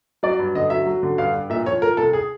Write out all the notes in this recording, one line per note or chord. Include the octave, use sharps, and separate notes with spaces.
F#3 D5
G2
D3 D#5
F#3 E5
F#3
D3
G2 F5
G2
A#2 E5
F3 C#5
F3 A#4
C2 A4
G#4